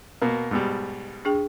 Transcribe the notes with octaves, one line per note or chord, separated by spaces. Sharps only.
B2 A#3
G#2 B2 G3
D4 G#4 G5